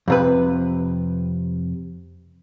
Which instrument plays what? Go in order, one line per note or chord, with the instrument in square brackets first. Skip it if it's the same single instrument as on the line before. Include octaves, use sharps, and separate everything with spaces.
[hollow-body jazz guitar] F2 C3 B4